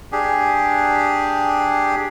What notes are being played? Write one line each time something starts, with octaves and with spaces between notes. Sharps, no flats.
D4 G4 G#4